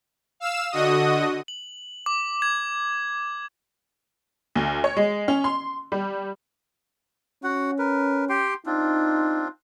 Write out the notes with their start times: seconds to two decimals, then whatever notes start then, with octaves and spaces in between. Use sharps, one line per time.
0.40 F5 E6 E7
0.71 D3 F#4 D#5 D#6
1.48 F#7
2.06 D6
2.42 G#6
4.55 D2
4.84 C#5
4.97 G#3
5.28 C#4
5.44 C6
5.92 G3
7.44 C#4 F#4 F#5
7.79 A#4 B4
8.29 G4 G5 C6
8.66 C4 D4 D#4 F4